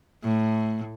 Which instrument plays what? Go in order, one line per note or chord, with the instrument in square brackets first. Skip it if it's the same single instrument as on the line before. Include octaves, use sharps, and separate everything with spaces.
[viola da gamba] A2